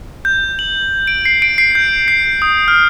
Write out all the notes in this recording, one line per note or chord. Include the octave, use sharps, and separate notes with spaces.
G6
F#7
D7
C7
D7
C7
G6
C7
D#6
F6